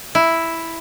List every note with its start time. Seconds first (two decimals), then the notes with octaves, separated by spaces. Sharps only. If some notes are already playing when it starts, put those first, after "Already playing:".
0.15 E4